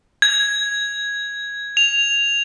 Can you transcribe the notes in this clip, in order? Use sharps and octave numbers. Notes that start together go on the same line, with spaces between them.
G#6
F7